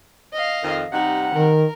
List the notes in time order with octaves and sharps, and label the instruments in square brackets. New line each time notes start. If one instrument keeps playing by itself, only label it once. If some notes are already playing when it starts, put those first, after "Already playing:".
[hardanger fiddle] D#5 F5
[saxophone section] F2 D#3
[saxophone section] C3 G3 F#5 [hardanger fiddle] D#4
[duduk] D#3 [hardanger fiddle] A#4